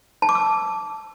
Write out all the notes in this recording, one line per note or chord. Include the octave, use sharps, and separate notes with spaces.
A5
D6
E6